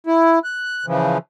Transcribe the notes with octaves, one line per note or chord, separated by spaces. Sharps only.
E4
F#6
C#3 E3 F3